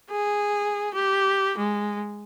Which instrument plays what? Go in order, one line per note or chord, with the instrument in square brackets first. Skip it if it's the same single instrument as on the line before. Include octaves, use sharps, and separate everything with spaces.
[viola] G#4
G4
G#3